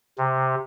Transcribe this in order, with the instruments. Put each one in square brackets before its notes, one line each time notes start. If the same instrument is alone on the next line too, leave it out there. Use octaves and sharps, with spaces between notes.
[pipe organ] C3